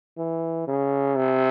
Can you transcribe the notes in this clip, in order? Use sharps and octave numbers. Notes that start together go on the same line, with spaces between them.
E3
C#3
C3